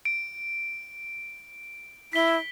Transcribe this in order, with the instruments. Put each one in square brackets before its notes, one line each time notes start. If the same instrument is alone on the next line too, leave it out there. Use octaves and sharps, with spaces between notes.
[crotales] D7
[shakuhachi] E4 [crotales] B6 G7